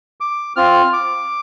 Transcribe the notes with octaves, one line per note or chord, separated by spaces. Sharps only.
D6
C4 F4 F6
D6